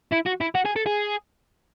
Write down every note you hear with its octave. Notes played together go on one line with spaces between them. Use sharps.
E4
F#4
E4
F#4
G#4
A4
G#4